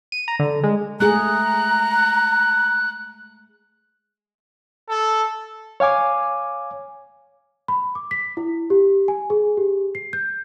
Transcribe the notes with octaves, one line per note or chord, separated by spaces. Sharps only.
D#7
A#5
D3
G#3
G#3 A3 G#4 A#5 F#6
A4
C#5 F5 G#5 D6
B5
D6
B6
E4
G4
G#5
G#4
G4
C7
G6